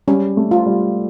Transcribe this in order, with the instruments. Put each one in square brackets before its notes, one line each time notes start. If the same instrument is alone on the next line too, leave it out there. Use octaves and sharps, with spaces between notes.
[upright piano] G3 [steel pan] C#4
[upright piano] A3
[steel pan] F4
[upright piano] G3